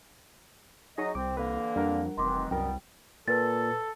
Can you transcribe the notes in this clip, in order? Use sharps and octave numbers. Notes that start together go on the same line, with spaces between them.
F#3 D#4 G#4 D#5 A#5 C#6
C2 C4 D6
D3 E3 A#3 B4
F2 G3 D4 A#4 F#5
F1 D#3 E3 C4 C6 D6
C2 F#2 B2 G3 B3 A#4 G5
A#2 A4 B4 A6